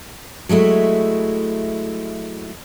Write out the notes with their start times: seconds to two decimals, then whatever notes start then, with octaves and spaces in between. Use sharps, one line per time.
0.49 F#3 G#3 A3 E4